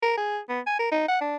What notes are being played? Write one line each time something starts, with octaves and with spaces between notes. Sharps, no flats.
A#4
G#4
B3
G#5
A#4
D#4
F#5
D4